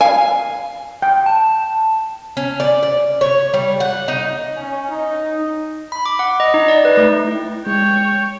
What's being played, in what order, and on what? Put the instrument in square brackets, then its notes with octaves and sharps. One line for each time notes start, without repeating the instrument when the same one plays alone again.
[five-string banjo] F5 G#5
[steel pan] G5
[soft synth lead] A5
[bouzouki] C#4
D5
D5
C#5
G3
F#5
D#4
[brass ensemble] C#4
D#4
[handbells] B5
D6
F#5
D#5
D#4
D5
B4
A3
[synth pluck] E4 G5
[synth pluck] G#3 [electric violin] C#5 [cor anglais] G5